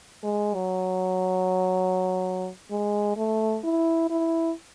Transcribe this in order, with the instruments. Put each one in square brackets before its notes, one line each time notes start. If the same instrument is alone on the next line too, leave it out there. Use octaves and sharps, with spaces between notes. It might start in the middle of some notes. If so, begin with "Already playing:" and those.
[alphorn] G#3
F#3
G#3
A3
E4
E4